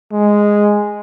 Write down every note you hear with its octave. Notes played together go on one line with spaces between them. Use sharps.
G#3